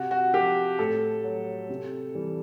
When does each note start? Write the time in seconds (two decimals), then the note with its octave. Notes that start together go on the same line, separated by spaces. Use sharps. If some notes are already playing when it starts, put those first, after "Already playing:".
Already playing: C3 F#4
0.11 F#4
0.33 F3 G4
0.79 A2 A4
1.24 F#3
1.70 C3
2.15 E3 G3